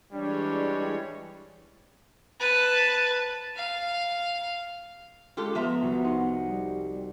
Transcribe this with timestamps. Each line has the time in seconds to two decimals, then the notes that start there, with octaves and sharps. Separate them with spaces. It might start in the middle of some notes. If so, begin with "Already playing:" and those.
0.12 E3 G3 G#3 D4 C#5
2.40 B4 A5
3.56 F5
5.37 G#3 F4 G4 A4 F#6
5.55 F3 B3 E5 A#5
5.82 C2 F#4
6.04 D#4 F#5 C6
6.47 G3